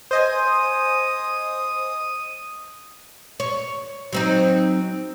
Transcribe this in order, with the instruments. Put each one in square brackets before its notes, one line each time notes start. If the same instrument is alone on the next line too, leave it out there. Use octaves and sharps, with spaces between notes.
[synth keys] C5 D#5 G#5 [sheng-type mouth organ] D#6
[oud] C#5
F#3 C4 D#4